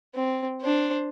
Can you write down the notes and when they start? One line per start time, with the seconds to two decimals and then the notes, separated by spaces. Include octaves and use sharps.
0.14 C4
0.61 D4 C5